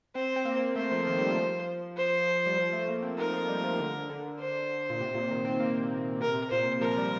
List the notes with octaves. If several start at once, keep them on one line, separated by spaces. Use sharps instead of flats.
C4 C5
C4
A#3
A3 C5
F3
D#3
G3
F3
C5
G3
F3
A3
A#3
C4
D#4 A#4
F4
G3
F3
D3
D3
C5
A#2
C3
A#2
D#3
C4
A#3
C3 A#4
A#2 C5
F3 A#4
G3